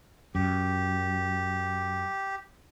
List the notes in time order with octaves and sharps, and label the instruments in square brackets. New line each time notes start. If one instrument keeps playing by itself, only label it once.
[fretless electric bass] F#2 [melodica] G4